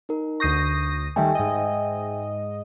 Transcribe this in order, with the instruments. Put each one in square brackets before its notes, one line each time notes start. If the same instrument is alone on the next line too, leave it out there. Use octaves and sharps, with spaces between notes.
[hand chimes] D#4 A#4
[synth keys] D2 D#6 A#6 [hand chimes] C#6 G6 C7
[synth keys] D#3 G3 A3 [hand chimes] E5 G5 G#5
[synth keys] G#2 D#5